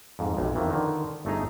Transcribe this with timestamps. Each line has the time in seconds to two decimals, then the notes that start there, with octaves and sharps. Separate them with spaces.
0.19 F2 G#2
0.37 B1 C3
0.55 F2 D#3 E3
0.70 D3 D#3
1.25 G1 A3 D#4 G#4 A#5